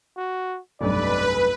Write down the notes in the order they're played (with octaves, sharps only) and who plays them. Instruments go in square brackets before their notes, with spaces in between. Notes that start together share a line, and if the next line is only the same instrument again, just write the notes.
[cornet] F#4
[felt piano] F1 B1 G2 [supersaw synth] B4 [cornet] D5